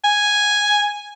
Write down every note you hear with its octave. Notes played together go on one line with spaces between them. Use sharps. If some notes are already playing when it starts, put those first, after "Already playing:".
G#5